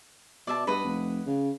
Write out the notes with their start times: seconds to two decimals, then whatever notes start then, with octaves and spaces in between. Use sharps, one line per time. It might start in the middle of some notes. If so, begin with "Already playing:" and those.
0.47 B2 D5 E5 A5
0.67 G2 B4 D#5 F#5
0.84 F1
1.26 C#3